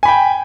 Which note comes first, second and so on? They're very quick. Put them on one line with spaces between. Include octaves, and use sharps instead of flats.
G#5 B5 G5